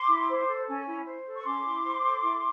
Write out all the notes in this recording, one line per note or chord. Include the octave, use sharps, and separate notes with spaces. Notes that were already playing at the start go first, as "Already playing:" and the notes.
Already playing: C6 D6
E4
C5
A4
C#4
E4
C5
A4
C#6
C#4 C6 D6
E4
C5
A4
E4